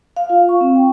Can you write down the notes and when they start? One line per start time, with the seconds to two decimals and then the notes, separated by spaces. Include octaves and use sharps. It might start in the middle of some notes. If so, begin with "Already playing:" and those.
0.17 F5
0.30 F4
0.49 C#6
0.61 C4
0.75 G5